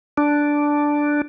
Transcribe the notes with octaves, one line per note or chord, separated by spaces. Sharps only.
D4